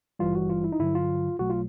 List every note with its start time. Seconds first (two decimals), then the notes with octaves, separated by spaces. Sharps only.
0.19 G#1 G2 E3 G3 F4
0.35 F#4
0.49 F4
0.64 E4
0.72 D#4
0.79 G2 D3 F#3 E4
0.95 F4
1.39 B1 B2 F#3 A3 F#4
1.50 F4